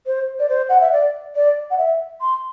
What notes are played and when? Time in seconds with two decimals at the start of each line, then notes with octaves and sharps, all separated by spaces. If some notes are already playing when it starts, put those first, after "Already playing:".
0.06 C5
0.39 D5
0.49 C5
0.69 F#5
0.81 E5
0.92 D5
1.35 D5
1.71 F#5
1.78 E5
2.21 C6